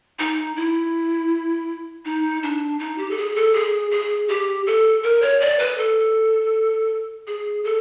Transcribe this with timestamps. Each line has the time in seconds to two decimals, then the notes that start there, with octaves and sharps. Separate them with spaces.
0.19 D#4
0.56 E4
2.05 D#4
2.43 D4
2.79 D#4
2.98 G4
3.10 A4
3.18 G#4
3.36 A4
3.54 G#4
3.91 G#4
4.28 G4
4.67 A4
5.03 A#4
5.22 C#5
5.40 D5
5.59 B4
5.78 A4
7.27 G#4
7.64 A4